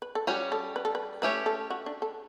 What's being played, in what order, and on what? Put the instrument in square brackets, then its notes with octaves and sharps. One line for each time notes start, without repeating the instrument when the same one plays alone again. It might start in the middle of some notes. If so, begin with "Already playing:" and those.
[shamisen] B4
A4
[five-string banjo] G3 C#4 F#4 C#5 [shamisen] G4
[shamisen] A4
B4
A4
B4
[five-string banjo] A3 C#4 G4 C#5 [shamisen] B4
[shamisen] A4
F#4
D4
A4